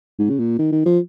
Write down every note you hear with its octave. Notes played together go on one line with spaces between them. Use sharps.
G#2
C#3
A#2
D#3
D#3
F3